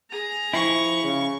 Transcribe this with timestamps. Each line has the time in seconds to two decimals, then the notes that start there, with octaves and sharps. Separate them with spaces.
0.10 G#4 A#5
0.54 F3 E4 C#6
1.04 C#3